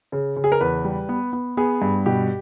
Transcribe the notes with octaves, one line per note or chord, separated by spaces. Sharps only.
C#3
C#3
G#4
A#4
E2 B4
G3
B3
B3
B3 G#4
G2
B2 G4